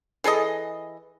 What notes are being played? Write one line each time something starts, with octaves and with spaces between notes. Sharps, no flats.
E3 G#4 A4 D#5